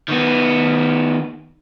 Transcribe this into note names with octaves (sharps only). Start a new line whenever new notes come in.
D#3 B3